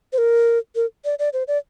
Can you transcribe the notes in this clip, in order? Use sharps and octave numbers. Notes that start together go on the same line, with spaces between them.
C5
A#4
A#4
D5
D5
C5
D5